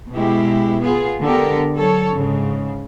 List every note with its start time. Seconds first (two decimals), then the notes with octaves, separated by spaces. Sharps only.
0.11 B2 G#3 E4 G4
0.82 B3 F4 G#4
1.22 D3 G#3 B3 G4 A4 A#4
1.75 F#3 A4 C#5
2.13 G#2 C#3